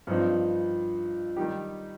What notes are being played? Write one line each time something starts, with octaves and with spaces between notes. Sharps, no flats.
G2 F3 C4 D#4
D#3 G3 D#4 G4